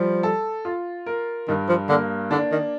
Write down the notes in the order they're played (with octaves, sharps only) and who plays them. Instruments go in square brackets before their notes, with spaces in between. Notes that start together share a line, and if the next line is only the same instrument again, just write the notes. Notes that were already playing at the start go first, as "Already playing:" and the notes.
Already playing: [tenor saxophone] F3 [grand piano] G3
[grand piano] A4
F4
A#4
[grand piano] G2 [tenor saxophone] D#3
[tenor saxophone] F3
[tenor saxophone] D3 [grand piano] A#3
[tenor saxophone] D3 [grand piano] D4
[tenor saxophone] D#3